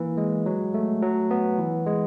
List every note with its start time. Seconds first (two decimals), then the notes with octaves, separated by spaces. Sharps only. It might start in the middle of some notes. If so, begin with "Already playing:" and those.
Already playing: E3 A#3
0.17 G#3
0.46 F#3
0.74 A3
1.02 F#3
1.31 B3
1.59 E3
1.86 G#3